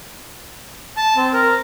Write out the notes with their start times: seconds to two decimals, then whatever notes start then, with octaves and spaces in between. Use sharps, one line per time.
0.97 A5
1.16 C4
1.33 A#4